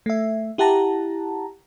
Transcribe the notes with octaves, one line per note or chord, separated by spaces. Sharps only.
A3 E5
E4 G4 F#5 A5 A#5